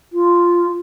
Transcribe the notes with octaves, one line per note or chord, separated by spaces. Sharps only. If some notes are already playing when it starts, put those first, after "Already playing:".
F4